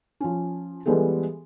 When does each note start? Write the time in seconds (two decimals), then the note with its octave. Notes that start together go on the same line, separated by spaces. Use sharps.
0.20 F3 C#4
0.86 E3 G3 G#3 B3 G4 A4